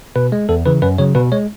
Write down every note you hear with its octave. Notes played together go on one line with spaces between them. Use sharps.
B2 B4
G#3
E2 A4
C#3 E3 B4
F#2 B4
C#3 F#3 C#5
B2 B4
G#3 C#5